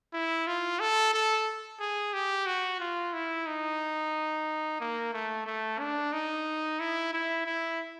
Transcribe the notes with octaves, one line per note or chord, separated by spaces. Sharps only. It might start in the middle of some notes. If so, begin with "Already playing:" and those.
E4
F4
A4
A4
G#4
G4
F#4
F4
E4
D#4
A#3
A3
A3
D4
D#4
E4
E4
E4